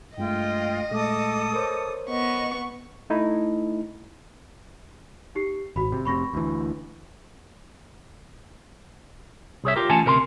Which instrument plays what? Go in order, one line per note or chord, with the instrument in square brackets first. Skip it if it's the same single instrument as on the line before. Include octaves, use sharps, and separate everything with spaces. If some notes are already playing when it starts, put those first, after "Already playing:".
[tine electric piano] G2 G#3 A3 [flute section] F4 G5 [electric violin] D#5
[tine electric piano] A#2 G#3 A3 [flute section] A4 D6 D#6
[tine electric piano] A#4 C5 C#5
[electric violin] B3 C#6 [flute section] D#5
[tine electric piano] A3 D#4 E4
[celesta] D#4 G4 C7
[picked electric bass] G#1 [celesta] F#4 B5
[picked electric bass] C3
[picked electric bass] F1 C3 [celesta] B5 C#6 A#6
[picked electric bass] D2 E3
[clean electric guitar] C2 G#4 C#5 E5
F4 G4 A#4
E3 A3 C#4 F4 G#5 A5
D2 C3 A#4 A#5 C6